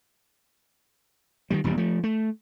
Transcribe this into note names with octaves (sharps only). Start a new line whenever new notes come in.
D#3 F3 G3
D#1 E2 G2 G3
F3 A3
A3